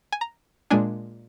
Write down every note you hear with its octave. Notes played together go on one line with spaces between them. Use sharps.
G#5
A#5
A#2 G#3 D4 G#5